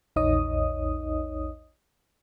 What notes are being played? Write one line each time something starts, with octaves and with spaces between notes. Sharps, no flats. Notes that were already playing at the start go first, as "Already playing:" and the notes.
A#1 E2 D#4 C#5 D#5 D#6